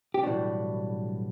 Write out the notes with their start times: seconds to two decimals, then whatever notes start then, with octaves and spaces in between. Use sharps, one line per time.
0.14 G4
0.23 B1 A2 E3 G3 D4 F#4